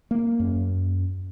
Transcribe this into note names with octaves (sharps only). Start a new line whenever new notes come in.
A#3
F#2